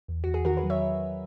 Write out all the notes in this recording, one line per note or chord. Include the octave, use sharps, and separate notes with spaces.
E2
E2 F#4
G#4
D#3 F#4 A#4
G#4 B4
F#3
C#5 E5